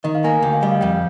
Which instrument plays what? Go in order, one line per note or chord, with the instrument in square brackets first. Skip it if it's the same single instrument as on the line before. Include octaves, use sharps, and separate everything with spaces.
[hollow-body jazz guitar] D#3 [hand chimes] D#5
[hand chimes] F5
[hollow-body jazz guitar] A#3 [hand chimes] G#5
[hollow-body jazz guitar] D2 [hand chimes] G5
[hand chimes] F5
[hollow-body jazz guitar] G3 [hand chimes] D#5
[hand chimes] F5
[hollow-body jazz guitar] F2 [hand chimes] G5